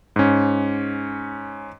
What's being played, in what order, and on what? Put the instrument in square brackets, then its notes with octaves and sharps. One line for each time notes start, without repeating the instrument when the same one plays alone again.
[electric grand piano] G#2 C#4